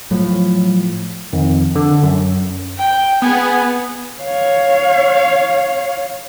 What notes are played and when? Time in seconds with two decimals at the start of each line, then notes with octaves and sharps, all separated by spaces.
0.11 A2 F3 F#3
1.33 F2 D#3
1.75 D3
2.03 F#2
2.77 G5
3.22 B3 G#4 G#5
4.22 C#5 F5